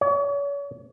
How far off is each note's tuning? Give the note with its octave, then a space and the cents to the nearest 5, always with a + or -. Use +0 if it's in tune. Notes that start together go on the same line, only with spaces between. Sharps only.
C#5 +40